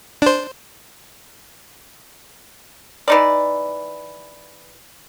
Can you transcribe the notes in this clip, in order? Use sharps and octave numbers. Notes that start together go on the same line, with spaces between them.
D4 C5
E3 D#4 D5